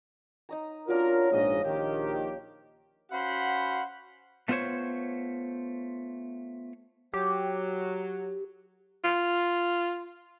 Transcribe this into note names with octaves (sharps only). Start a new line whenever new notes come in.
D#4 D#5 A#5
F#3 C#4 D4 F4 A#4
A#1 G#2 D#5 F5
A#1 D#3 G4 A5
C#4 F#4 C5 F5 F#5 B5
A3 B3 F4 A#4 C5 C#5
F#3 G4
F4